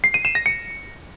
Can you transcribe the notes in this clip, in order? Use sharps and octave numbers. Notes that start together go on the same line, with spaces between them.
C7
D#7
E7
A#6
C#7